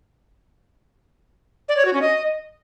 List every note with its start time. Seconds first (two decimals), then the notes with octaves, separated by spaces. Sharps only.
1.69 D5
1.77 C#5
1.85 F#4
1.93 C#4
2.02 D#5